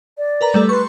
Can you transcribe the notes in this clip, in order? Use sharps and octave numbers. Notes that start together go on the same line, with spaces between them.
D5
A#4 B4 A#5
G3 A3 A4
B4 C6 C#6